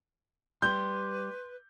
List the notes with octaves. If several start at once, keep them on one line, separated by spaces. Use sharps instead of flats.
G3 G4 B4 C6 G6